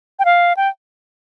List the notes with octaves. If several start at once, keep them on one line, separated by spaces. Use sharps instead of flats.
G5
F5
G5